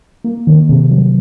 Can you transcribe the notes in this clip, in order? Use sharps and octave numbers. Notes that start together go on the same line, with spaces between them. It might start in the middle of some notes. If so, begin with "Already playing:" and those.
A#3
D#3
C3
F#3